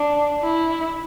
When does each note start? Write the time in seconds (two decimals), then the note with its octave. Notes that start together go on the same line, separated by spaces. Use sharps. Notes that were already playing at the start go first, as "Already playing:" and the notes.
Already playing: D4
0.43 E4